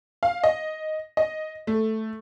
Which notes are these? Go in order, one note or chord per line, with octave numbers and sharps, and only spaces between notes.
F5
D#5
D#5
A3